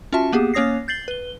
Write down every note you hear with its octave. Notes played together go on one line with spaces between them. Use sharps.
C#4 F4 F#4 E5 A5
A#3 B3 G4 G#4
A#3 C#4 C#5 D#6 A#6 C7
G6 A6 C7 F#7 G7
B4 G7